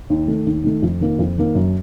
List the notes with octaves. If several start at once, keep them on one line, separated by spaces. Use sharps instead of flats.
D#2
D#3 A3
D#2
D#3 A3
F2
D#3 A#3
F2
D#3 A#3
F#2